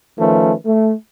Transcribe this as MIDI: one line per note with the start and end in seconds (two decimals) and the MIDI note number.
0.19 0.53 51
0.19 0.53 53
0.19 0.53 57
0.19 0.53 61
0.19 0.53 71
0.66 0.93 57